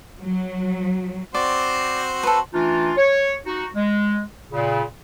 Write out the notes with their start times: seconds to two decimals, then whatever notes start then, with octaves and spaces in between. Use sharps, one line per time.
0.19 F#3
1.34 C4 F#4 C5 D5
2.23 A4 B4
2.53 E3 A3 D4 D#4 F4
2.97 C#5
3.46 D#4 F#4
3.74 G#3
4.52 A#2 C#3